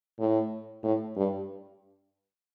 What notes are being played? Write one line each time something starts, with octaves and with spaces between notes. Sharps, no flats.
A2
A2
G2